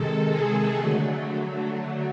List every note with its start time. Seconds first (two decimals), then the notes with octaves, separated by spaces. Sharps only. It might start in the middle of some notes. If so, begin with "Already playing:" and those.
Already playing: C3 D#3 G#3 A4
0.27 G#4
0.71 D3 F#3 A3